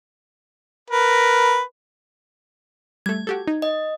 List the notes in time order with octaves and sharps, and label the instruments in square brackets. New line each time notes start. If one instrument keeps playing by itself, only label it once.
[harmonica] A#4 B4
[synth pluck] G3 A3 [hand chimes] G#6
[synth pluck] F#4 G4 A4
D#4
[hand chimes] D#5